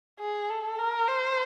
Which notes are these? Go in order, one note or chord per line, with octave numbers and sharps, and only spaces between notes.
G#4
A4
A#4
C5